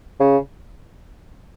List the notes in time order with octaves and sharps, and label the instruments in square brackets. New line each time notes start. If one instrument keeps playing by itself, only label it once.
[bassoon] C#3